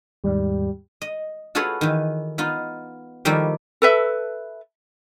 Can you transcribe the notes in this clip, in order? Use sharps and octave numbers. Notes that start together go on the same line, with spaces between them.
D#2 G#2 G3
D#5
F4 F#4 G#4 A4 B4 C#5
D#3 E3
B3 D#4 F4
D#3 F3 G3 A3 A#3 E4
A4 B4 E5